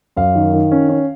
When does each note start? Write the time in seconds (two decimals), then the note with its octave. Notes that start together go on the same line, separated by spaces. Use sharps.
0.17 F#2 F5
0.35 D#3
0.53 D#3
0.72 C#4
0.89 C#4